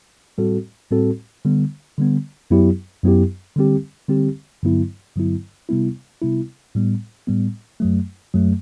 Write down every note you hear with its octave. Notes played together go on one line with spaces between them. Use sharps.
A2 G3 C4 F#4 A4
A2 G3 C4 F#4 A4
D3 G3 B3
D3 G3 B3
F#2 F#3 B3 E4 G4
F#2 F#3 B3 E4 G4
D3 G3 C4 G4
D3 G3 C4 G4
G2 D3 F#3 B3 E4
G2 D3 F#3 B3 E4
C3 G3 B3 E4
C3 G3 B3 E4
A2 G3 B3
A2 G3 B3
F#2 F#3 A3
F#2 F#3 A3